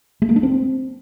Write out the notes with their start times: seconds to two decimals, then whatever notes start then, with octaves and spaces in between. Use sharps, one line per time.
0.22 A3
0.29 A#3
0.36 D4
0.43 C4